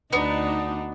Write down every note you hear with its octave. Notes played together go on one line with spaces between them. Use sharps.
D2 B3 D4 D#4